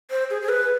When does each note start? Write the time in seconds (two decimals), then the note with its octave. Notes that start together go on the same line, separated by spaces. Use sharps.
0.11 C5
0.30 G#4
0.42 G#4
0.49 B4